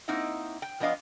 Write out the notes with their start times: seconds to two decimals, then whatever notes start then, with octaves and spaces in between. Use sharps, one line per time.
0.08 A#3 C4 D#4 E4 D#5 F#5
0.62 G5
0.80 F3 B3 D4 D#5 F5